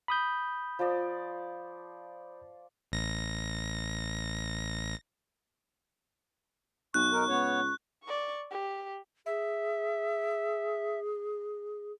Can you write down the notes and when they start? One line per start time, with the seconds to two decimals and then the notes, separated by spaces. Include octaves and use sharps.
0.08 B5 D#6 G6
0.79 F3 D5
2.92 A1 A#6
6.94 B1 C#6 F#6
7.12 D#4 A#4
7.29 C#2 B3 C#5
8.03 D5 C#6
8.51 G4
9.26 G#4 E5